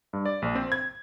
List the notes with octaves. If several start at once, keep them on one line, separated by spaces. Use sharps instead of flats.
G2
D5
A#1
C4
G#6